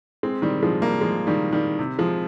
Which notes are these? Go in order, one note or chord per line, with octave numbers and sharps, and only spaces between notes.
G#3 C4
D#3 G3
F3 G#3
G3 A#3
F3 G#3
D#3 G3
D#3 G3
C3
F3 G#3